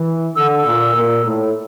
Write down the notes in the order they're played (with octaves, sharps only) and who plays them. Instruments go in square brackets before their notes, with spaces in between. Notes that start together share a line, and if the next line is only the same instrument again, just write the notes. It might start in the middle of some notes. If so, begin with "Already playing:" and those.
Already playing: [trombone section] E3
[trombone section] D3 [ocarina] E6
[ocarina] E6
[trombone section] A#2
A#2
A2